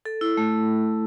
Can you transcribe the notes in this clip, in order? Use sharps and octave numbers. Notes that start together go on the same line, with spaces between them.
A4
E4
A3